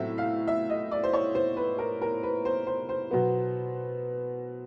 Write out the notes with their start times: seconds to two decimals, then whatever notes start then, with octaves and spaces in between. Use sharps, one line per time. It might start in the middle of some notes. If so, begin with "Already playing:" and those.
Already playing: A2 F#3 A3 C4 E5
0.18 F5
0.48 E5
0.70 D#5
0.92 D5
1.03 C5
1.13 C#5
1.35 C5
1.57 B4
1.78 A#4
2.02 A#4
2.23 B4
2.45 C5
2.67 C5
2.89 C5
3.11 B2 F#3 B3